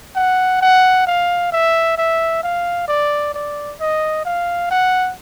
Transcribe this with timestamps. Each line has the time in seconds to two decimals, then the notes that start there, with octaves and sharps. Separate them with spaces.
0.16 F#5
0.61 F#5
1.07 F5
1.52 E5
1.98 E5
2.43 F5
2.88 D5
3.34 D5
3.80 D#5
4.25 F5
4.71 F#5